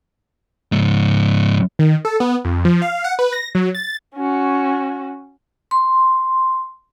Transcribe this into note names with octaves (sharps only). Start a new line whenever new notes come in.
C#2 G#2
D#3
A4
B3
F2
F3
F5
F#5
B4
A#6
F#3
A6
C#4 F#4
C6